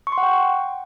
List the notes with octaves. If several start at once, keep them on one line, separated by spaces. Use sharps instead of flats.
C#6
C6
F#5
G5